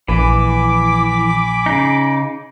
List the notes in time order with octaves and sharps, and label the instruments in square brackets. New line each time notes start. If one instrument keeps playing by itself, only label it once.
[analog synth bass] A#1 [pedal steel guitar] E3 [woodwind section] G#5 B5 D6
[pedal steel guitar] C#3 D#4